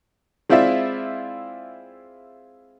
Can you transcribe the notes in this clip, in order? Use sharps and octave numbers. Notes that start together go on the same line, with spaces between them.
G#3 C4 E4 F4 D5 E5